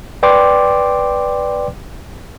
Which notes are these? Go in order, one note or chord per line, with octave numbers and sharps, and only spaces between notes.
B4 D5 G5 C6 D6